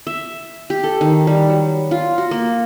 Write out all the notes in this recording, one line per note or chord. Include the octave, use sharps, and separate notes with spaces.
E5
G4
A4
D#3
G3
F#3
F4
F#4
A#3